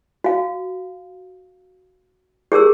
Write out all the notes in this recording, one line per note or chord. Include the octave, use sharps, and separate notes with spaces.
F#4 F5
G4 G#4 A#4 E6